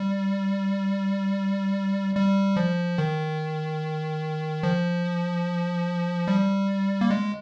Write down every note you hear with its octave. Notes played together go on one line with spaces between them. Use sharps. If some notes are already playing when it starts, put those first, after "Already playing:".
Already playing: G3
G3
F3
D#3
F3
G3
A#3
G#3